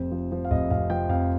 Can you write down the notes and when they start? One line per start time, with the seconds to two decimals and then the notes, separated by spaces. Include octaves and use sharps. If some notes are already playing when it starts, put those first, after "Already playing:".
Already playing: F1 F2 C5
0.12 F3
0.32 F3
0.45 F5
0.51 F1 D#5
0.70 F1 F5
0.90 F3 G5
1.09 F2 F5